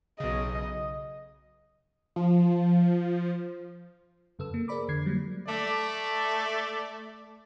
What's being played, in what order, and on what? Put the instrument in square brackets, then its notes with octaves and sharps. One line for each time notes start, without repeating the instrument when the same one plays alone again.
[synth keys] B1 C#3 [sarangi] D#5
[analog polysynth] F3
[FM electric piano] F#2 C#3 A4 B4 E6
A#3
G#4 A#4 C5 D5 B5 D6
F2 D3 G#6 C7
F#3 G3 A#3
[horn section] A3 D5